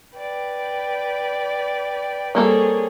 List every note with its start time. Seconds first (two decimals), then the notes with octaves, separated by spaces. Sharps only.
0.17 B4 D5 G5
2.35 G3 A#3 C4 G#4 A4 C#5